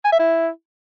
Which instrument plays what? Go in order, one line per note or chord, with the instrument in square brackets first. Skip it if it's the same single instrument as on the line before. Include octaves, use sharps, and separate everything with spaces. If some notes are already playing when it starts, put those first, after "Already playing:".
[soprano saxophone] G#5
E5
E4